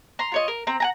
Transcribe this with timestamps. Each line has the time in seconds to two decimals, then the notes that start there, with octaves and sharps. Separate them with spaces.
0.19 A#5 C6
0.32 F4 C#5 D#5
0.48 A#4
0.67 C4 A#5
0.80 F#5 G#5 A#5